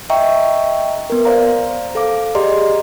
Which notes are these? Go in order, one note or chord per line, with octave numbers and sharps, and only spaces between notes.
D#5 E5 G5 A#5 C#6
B3 A#4
C5 D5 F5 A#5
A4 F5 D6
G4 G#4 D5 D#5 A#5 C6